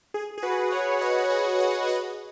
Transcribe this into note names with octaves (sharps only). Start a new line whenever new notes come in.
G#4
G#4
F#4 B4
C#5 F#5
B4 D#5
G#4 C#5
C#5 F#5
B4 D#5